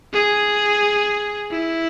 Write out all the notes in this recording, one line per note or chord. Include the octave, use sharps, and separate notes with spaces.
G#4
E4